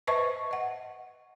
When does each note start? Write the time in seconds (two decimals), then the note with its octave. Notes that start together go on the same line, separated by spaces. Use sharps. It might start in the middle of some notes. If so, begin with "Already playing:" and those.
0.07 B4 C5 D#5 E5 A5 C#6
0.51 D#5 F#5